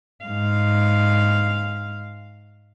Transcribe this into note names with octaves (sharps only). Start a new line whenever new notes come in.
G#2 F5